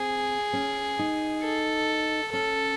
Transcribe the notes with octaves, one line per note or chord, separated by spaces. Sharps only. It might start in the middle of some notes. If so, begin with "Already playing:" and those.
Already playing: C4 G#4
C#4
D#4
A4
C#4 A4